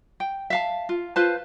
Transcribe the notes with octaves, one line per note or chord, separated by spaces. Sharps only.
G5
E5 F5 A5
F4
F4 B4 C5 A5